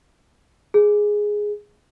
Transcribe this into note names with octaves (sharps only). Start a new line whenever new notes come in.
G#4